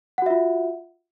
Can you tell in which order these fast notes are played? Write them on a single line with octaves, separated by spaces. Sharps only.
F#5 F#4 E5 F4